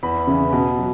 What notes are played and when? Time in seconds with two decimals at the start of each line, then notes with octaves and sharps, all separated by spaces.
0.03 E2 B5
0.27 C#3 E3
0.53 B2
0.79 F#3